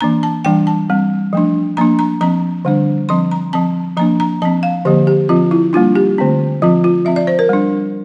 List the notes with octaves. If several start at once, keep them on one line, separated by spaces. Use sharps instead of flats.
E3 A#3 D4 A#5
A5
E3 G3 D4 G5
A5
G3 C4
F3 A3 D4
F3 A#3 D4 A#5
A#5
F3 C4 A#5
D3 G3 D4
F3 C4 C6
A#5
F3 C4 A5
F3 A#3 D4 A#5
A#5
F3 C4 A5
F5
D3 F3 A#3 G4
G4
F3 C4 F4
E4
G3 A#3 D4 F4
G4
D3 A3 C4
F3 C4 F4
F4
F3 C4 E5
D5
C5
A#4
G3 D4